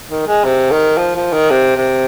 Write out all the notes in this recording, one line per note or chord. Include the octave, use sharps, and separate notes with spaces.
D#3
G#3
C3
D#3
F3
F3
D#3
C3
C3